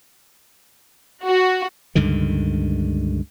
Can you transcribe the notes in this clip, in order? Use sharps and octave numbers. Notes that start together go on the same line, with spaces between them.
F#4
C#2 G2 D3 D#3